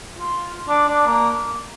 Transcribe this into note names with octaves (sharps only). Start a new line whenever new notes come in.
F4
D4
D4
A#3